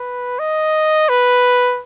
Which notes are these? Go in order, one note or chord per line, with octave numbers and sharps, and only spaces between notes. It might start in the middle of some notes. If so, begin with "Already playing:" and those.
Already playing: B4
D#5
B4